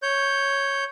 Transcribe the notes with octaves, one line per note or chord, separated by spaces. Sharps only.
C#5 G6